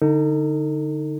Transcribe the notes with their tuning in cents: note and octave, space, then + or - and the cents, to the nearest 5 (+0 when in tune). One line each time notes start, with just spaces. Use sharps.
D3 +0 D#4 +0 A4 +45